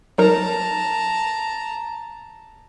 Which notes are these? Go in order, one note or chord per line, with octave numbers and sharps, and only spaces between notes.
F#3 D#4 A#4 A5 A#5